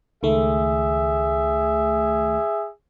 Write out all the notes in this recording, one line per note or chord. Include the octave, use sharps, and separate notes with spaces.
C#2 D#3 A3 G#4 E5